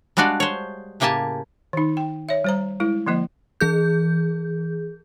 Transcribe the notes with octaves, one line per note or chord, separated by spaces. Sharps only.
G3 G#3 D4 F#4 D5 F5
C5 C#5
A2 C#3 A#3 G4 G#5 A5
D#3 D#4
G5
C#5 E5
G3 C5 A#5
G#3 E4
D3 F3 A#3 D#5
E3 G#4 G6